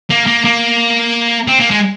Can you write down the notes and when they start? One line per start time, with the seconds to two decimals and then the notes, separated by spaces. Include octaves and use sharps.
0.10 A#3
0.27 A#3
0.45 A#3
1.48 C4
1.59 A#3
1.71 G#3